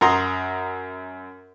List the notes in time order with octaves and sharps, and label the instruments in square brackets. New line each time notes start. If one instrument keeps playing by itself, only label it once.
[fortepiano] F#2 F#5 A#5 C6 D#6